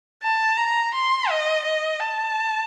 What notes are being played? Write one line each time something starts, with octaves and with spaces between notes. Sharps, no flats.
A5
A#5
C6
D#5
D#5
A5